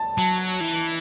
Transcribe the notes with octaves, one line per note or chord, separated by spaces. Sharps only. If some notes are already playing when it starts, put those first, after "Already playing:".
Already playing: A5
F#3
E3